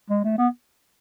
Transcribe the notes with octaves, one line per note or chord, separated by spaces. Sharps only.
G#3
A3
B3